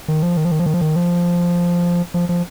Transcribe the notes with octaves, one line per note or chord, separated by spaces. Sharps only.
D#3
F3
D#3
F3
D#3
F3
D#3
F3
D#3
F3
F3
F3